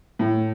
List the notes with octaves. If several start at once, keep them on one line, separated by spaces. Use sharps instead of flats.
A2